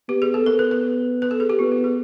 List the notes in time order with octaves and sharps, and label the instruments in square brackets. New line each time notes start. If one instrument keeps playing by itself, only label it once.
[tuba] B3 [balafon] G4
[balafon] G#4
A4
[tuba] B3 [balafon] A#4
[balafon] B4
B4
B4
A4
G#4
G4
[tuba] B3 [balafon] F4
[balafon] G4
G#4